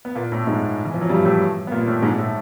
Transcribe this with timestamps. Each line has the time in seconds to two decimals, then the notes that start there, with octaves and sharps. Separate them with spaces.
0.05 B3
0.15 A#2 A#3
0.32 A2 A3
0.47 G#2 G#3
0.85 E3
0.94 F3
1.01 F#3
1.09 G2 G3
1.25 A2 A3
1.67 B3
1.71 A#2 A#3
1.87 A2 A3
2.02 G#2 G#3
2.18 A2 A3